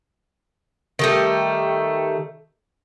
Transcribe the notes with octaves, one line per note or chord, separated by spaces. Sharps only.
D#3 G3 A3